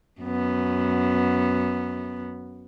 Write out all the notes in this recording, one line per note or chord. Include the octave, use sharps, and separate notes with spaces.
F#2 B3